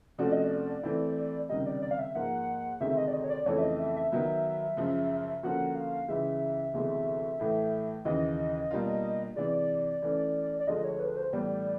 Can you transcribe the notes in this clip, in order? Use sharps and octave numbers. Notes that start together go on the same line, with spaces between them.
C3 F3 A3 C#4 F#4 D5
D#5
D5
E3 A3 C4 E4
C#2 C3 D#3 G3 D#5
D5
D5
F5
E5
G#2 F3 A#3 F#5
D2 C3 D#3 G#3 C4 E5
D#5
D5
D#5
C#5
D5
F2 C#3 E3 A3 C#5
E5
D#5
E5
E5
D#3 F#3 B3 E5
F#2 C#3 F3 G#3
D3 F3 A#3 C#4 F#4 F#5
F5
C#2 C#3 E3 G#3 E5
D2 C3 E3 G#3 B3
A2 E3 A3
D#2 C#3 E3 D#5
B2 G3 A#3 D4 F4
C3 E3 G#3 D5
E3 A3 C#4
D5
D2 D3 F3 G#3 D#5
C#5
B4
C5
A2 E3 G3 B3 D5